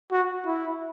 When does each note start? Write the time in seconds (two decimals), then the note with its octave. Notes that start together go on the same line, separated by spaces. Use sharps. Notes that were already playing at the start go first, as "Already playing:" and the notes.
0.12 F#4
0.46 E4